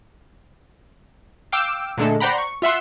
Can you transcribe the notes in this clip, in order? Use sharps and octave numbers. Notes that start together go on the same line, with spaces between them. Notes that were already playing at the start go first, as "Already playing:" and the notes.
F5 G5 D6 E6
A#2 D3 G#3 A3 D4 A4
C5 D5 F#5 G5 A#5 B5
C#6
F4 E5 F#5 C6